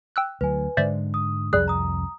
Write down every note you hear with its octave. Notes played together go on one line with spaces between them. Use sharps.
G5 E6 F#6
D2 F#3 B4 G#5
G#2 D3 G#3 C5 D5 E5
D#6
C2 F2 G3 G#4 F#6
A#5 D#6